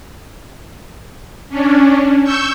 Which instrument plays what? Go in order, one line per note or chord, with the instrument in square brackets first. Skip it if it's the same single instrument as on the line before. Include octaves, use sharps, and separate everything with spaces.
[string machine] C#4 D4
C#6 E6 G6